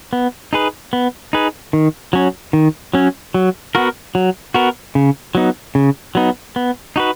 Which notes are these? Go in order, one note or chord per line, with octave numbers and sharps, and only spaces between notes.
B3
D#4 G#4 B4
B3
D#4 G#4 B4
D#3
F#3 C#4
D#3
F#3 C#4
F#3
B3 F#4 A#4
F#3
B3 F#4 A#4
C#3
F#3 B3 D#4
C#3
F#3 B3 D#4
B3
D#4 F#4 B4